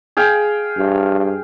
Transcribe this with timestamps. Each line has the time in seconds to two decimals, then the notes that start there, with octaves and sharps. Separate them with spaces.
0.17 G#4 F5 G5
0.78 G2